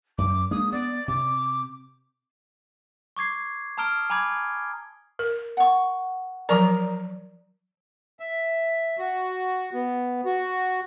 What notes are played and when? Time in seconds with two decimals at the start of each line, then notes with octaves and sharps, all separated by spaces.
0.18 F#2 D6
0.51 G#3 A#3 D4 D#6
0.72 B3 D5
1.08 C3 D6
3.17 C#6 D6 G#6 C7
3.78 A5 A#5 D#6 F6 D7 G7
4.10 G#5 A#5 B5 D6 G#6
5.19 A#4
5.57 F#5 C#6
6.49 F3 F#3 A#4 D5 A#5 D#6
8.20 E5
8.99 F#4
9.74 B3
10.25 F#4